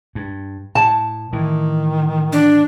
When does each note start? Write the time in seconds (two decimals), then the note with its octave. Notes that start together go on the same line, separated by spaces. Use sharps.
0.15 G2
0.75 A2 A5
1.33 A2 D#3 E3
2.32 D4